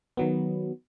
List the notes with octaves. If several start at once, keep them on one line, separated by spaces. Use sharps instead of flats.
D#3 F#3 B3